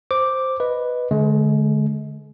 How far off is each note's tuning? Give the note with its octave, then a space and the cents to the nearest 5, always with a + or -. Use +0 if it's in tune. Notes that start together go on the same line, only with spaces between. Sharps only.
C5 +0 D6 +0
B4 +0 D#5 +0
D3 +0 G#3 +35